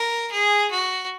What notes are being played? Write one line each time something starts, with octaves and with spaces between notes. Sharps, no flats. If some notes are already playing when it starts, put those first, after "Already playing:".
Already playing: A#4
G#4
F#4